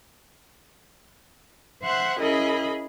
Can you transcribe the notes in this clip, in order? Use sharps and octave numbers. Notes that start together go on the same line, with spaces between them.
C5 E5 F#5 C6 F#6
C#4 E4 G#4 A#4 D#5 B5